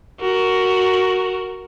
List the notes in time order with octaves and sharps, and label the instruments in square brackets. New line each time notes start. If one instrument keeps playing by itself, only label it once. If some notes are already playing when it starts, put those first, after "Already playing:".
[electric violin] F#4 A#4